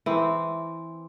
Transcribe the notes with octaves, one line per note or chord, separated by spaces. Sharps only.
E3 C4